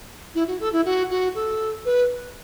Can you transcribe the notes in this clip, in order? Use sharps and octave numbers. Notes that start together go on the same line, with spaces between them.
E4
F#4
A4
E4
F#4
F#4
A4
B4